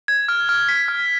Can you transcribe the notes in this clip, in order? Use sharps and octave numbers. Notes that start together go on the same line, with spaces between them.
G#6
F6
F6
B6
F6